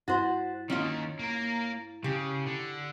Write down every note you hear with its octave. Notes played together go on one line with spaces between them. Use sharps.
G2 E4 F#4 C5 A6
D#3 A#3 C#4 F4
A#3 A#4
C#3 G4
D3